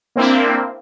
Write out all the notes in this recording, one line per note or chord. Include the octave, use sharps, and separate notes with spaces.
A#3 C4 D4 E4